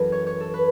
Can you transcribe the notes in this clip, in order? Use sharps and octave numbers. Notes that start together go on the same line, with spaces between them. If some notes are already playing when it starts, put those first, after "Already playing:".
Already playing: F#2 E3 A4 B4
C#5
C#5
A4
B4